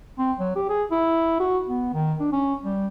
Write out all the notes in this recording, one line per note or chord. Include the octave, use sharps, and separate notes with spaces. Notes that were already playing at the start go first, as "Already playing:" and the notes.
C4
F#3
G4
G#4
E4
F#4
B3
D#3
D4
C#4
G3